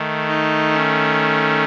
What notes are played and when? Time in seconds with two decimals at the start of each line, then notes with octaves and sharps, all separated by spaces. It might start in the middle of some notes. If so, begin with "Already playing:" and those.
Already playing: D#3 A3
0.28 D#4
0.74 C#4